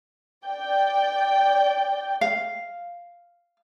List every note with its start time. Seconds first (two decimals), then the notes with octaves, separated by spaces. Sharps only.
0.45 D5 G5
2.21 F5